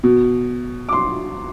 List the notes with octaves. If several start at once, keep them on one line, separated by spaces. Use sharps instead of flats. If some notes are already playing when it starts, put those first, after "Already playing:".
B2
D6
C6